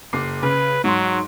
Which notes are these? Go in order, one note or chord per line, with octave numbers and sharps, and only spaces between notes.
F#1 D6 C7
C#3 B4
G#2 F#3 C6